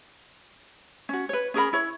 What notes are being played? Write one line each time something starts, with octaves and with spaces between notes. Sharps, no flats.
C#4 F#4
B4 C#5
C#4 G#4 A#4 B5
E4 C#5